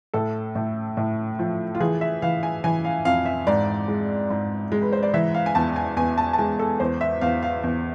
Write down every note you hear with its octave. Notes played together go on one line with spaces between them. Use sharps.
A2 A4
A2
A2
F3
F4
E3 G#4
E5
E3 F5
G#5
E3 G#5
F5
F2 F5
E5
G#2 D5
G#3
G#2
G#3
B4
C5
D5
E3 E5
F5
G#5
E2 A5
G#5
E2 G#5
A5
A5
G#3 G#5
A4
E2 C5
E5
E2 F5
F5
E2